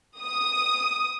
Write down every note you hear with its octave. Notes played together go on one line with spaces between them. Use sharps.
D#6